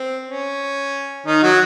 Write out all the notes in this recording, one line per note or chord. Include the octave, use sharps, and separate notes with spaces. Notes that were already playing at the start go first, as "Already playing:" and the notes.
Already playing: C4
C#4
D#3 D#4
F#3 F#4